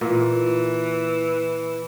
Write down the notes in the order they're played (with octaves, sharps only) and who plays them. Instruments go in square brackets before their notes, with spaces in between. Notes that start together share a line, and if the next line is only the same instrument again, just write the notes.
[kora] A#2 [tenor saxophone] E3